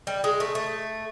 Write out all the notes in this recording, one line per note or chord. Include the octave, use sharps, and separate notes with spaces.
G3
G#3
A3
A3